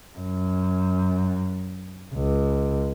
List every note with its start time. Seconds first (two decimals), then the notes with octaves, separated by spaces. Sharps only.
0.17 F#2
2.14 C#2